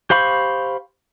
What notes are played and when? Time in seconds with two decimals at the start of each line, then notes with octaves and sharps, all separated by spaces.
0.10 G4 C5 F5 B5 C#6